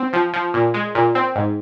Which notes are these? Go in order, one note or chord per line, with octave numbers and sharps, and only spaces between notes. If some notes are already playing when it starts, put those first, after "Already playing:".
Already playing: C4
F3
F3
A#2
G#3
A#2
C4
G#2